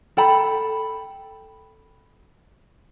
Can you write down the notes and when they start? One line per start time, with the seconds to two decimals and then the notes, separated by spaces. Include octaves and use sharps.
0.17 A4 G5 B5